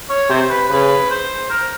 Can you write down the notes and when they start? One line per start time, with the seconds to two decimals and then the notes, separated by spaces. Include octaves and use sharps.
0.10 C#5
0.29 C3 C5
0.50 B4
0.69 C#3 B4
1.11 C5
1.50 A#4